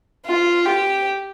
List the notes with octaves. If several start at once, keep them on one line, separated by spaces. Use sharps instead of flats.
F4
G4